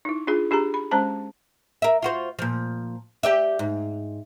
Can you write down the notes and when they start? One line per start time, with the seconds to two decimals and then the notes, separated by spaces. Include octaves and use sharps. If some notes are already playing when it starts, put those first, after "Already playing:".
0.05 D#4 E4
0.27 D4 F4 G#4
0.51 D4 G4 G#4 A#5
0.74 B5
0.91 G#3 C#4 C5 A5 A#5
1.82 A#4 E5
2.02 F4 F#4 C5
2.39 A#2 F3
3.23 G4 D5 E5
3.59 G#2